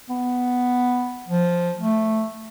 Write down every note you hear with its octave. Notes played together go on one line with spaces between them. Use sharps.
B3
F3
A3